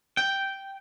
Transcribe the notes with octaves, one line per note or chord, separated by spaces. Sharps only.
G5